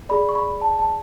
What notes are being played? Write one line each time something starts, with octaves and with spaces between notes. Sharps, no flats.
G#4 D5 B5
C#6
B5
A5
A5